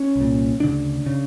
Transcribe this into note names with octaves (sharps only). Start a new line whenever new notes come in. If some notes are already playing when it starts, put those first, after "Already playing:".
Already playing: C#4
C2
A#2
D2 C#3 D4
C#3